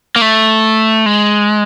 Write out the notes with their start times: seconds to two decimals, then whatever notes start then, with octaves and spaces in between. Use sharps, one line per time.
0.16 A#3
0.21 A3
1.06 G#3